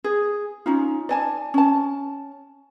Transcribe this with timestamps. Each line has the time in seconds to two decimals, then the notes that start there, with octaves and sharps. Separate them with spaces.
0.04 G#4
0.66 C#4 D#4 F4
1.09 D5 G#5 A5
1.54 C#4 A5